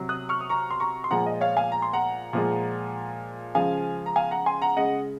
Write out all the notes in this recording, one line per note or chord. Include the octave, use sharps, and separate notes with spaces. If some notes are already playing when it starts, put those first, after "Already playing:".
Already playing: C3 F#3
D#6 F#6
C#6 F6
D#6
A#5 C#6
C6
A#5 C#6
C6
A#2 F3 G#3 F#5 A#5
D#5
C#5 F5
F5 G#5
A#5
C6
F#5 A#5
A#2 F3 G#3
C#3 F3 G#3 F5 G#5
A#5
F5 G#5
F#5 A#5
G#5 C6
F#5 A#5
C#3 G#3 D#5 F#5